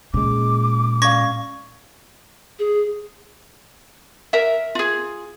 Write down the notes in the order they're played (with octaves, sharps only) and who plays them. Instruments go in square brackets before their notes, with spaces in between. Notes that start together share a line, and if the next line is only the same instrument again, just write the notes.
[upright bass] A#2 [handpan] G#3 C#4 [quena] D6
[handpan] C#4 D5 F5 [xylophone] C#6 G#6 A#6
[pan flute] G#4
[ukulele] A#4 E5
F4 G#4